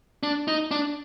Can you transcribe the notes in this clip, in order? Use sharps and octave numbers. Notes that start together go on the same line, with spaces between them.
D4
D#4
D4